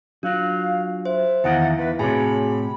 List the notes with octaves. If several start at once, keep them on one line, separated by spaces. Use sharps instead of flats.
F#3 D4 F4 F5
C5 E5
E2 D#3 D#4 E4 F5 F#5
E2 B4
A2 C3 F#4 G#4 C#5 G#5 B5